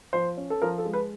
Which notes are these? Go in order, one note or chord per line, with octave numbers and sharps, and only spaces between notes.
F3 C5
C#4
A4
F3 A#4
A4
G#3
B4